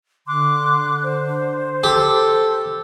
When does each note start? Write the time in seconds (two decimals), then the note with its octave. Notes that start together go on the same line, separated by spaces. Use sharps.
0.27 D3 C6 D6 F#6
1.05 C5
1.84 G4 A4